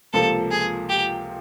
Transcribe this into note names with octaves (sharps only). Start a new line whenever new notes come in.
C#2 C3 F3 A#3 A4
G#4
G4